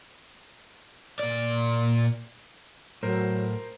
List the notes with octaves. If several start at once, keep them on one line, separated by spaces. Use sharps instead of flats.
A#2 D5
A2 F#3 A#4 C5